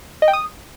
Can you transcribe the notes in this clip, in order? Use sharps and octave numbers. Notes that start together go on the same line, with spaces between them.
D#5
G5
D#6